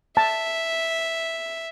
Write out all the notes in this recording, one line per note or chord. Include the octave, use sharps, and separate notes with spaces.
E5 A5